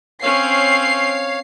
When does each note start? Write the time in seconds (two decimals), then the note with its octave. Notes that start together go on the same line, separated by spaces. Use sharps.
0.23 C4 C#4 C#5 F5 C7